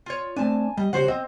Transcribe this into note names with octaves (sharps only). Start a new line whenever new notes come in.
F4 C#5
A3 C4 D4 G#5 A5
G3 D#5
C#2 F#3 F#4 G4 C5 F#5
C4 D#5